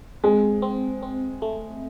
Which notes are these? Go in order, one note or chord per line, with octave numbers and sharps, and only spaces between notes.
G#3 C4
C4
C4
A3